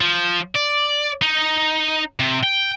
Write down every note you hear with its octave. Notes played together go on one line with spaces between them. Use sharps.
F3
D5
D#4
C3
G5